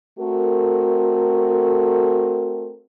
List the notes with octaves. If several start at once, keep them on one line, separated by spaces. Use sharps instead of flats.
A3 C4 F#4 A4 A#4